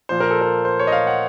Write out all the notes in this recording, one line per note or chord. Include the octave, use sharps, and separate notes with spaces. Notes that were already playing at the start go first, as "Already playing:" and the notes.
A#2 F3 C5
A#4
A4
A#4
C5
C#5
D#5
F5
F#5